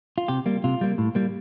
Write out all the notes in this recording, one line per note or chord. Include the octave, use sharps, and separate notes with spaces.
F4
C3 G4
G3 A#3
C3 F4
G3 A#3
A2
G3 A#3